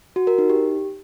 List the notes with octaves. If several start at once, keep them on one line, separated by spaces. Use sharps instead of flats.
F#4
A#4
D#4
G4